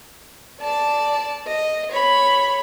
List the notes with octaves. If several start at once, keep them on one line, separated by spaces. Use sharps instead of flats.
D5 A5
D#5
C#5 B5